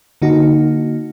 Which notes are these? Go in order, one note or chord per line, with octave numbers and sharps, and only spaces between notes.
D3 A#3 D#4 F#4